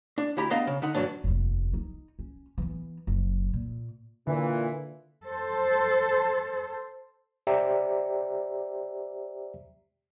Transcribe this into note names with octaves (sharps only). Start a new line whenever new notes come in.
D4
D2 E4 G4 A#5
B3 D4 D#5 F5 A#5
C#3
D3 D#4 F#5
G2 E3 F#3 D4
F1 D#2
D#4
C#4
E3 B3
F#1
A#2
A#2 D3 E3
A4 C5
G4 C5 D5 E5 G5 A#5